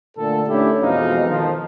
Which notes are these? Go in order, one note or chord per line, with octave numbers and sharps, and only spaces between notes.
A#2 D3 A3 A4
A3 C#4 D4 E4 G4
F2 B2 E3 G#3 D#4 F5
D#3 F3